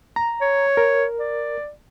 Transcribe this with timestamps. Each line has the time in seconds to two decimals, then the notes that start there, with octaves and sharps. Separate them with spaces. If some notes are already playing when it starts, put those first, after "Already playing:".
0.16 A#5
0.41 C#5
0.77 A#4
1.19 D5